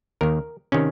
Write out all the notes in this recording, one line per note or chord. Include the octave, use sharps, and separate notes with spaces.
D#2 D#3 A#4
C3 D#3 C#4